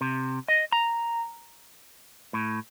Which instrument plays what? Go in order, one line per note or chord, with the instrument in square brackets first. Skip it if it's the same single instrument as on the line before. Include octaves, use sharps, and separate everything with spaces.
[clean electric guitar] C3
D#5
A#5
A2